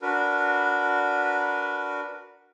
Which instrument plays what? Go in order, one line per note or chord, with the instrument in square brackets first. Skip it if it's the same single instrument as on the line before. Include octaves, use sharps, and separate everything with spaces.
[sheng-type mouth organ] D4 F#4 A#4 B4